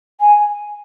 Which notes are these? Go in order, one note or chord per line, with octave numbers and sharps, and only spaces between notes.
G#5